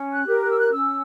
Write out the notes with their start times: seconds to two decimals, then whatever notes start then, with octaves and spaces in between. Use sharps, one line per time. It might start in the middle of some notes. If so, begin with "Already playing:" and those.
Already playing: C#4
0.12 F#6
0.26 G4 A#4
0.42 F#6
0.50 E6
0.59 F#6
0.72 C#4 E6